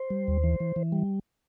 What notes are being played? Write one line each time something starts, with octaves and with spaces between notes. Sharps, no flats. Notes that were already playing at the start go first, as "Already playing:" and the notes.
Already playing: C5
G3
D#2
E3
E3
E3
G3